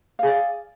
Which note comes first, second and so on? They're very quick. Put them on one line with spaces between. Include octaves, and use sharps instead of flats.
F5 G#4 D5